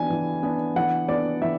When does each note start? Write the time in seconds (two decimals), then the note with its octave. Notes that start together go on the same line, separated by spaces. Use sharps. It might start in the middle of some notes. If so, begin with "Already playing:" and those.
Already playing: E3 B3 D4 G#5
0.10 E3
0.43 B3 D4
0.76 E3 F#5
1.08 B3 D4 D5
1.42 E3 E5